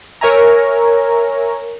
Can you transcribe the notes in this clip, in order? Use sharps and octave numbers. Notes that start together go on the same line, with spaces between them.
A#4 C#5 E5 G#5 A#5